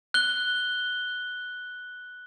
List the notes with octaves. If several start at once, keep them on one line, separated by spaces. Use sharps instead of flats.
F#6 G7